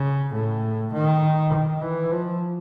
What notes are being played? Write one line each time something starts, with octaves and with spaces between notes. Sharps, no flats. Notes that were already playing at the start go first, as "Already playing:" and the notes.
Already playing: C#3
A2
D#3
D#3
E3
F3